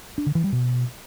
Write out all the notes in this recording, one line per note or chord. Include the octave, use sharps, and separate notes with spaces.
D4
D3
E3
G3
B2